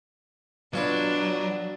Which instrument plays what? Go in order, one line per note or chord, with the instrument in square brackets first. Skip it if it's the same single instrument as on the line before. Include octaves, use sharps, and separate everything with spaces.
[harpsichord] B2 F4 B4 [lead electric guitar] F#3 [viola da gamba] D4